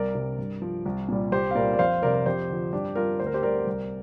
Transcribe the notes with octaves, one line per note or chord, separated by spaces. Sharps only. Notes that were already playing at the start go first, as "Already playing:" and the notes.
Already playing: C2 A#4 D5
C3 G3
G2
F3
C2
A#2 G3
C2 G4 C5
F5
A#2 G3 A#4 D5
D5
F2 C5 F5
C3 G3 A#4 D5
A#4
F2 G4 C5
D3 F3
G2 D4 G4
G3 F4 A#4
D2 C5
A#4
G4 C5
D3 G3 A#4 D5
C2